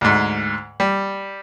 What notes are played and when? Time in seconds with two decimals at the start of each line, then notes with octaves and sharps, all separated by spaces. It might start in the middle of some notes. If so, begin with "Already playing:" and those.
0.01 D2 G#2
0.80 G3